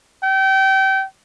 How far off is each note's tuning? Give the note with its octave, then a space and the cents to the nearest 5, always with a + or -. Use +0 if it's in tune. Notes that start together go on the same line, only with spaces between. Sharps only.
G5 -30